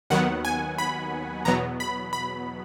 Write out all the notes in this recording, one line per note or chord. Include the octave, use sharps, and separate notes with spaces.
D#2 D#3 F#3 B3 F#5
G#5
B5
E2 B2 F#3 B3 A#5
B5
B5